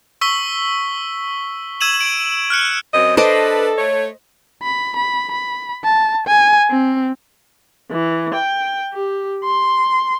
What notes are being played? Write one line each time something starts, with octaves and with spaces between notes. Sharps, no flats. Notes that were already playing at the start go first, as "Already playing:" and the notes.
C#6 E6 B6 G7
E6 G#6 D#7 E7 F#7
D7
F6 F#6 C#7
F#2 C4 D#5
D4 A4 B4 C5 D#5 D6
A3 C#5
B5
B5
B5
A5
G#5
C4
E3
G5
G4
C6